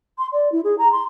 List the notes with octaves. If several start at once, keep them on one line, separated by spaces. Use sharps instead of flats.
C6
D5
E4
G#4
A#5
C6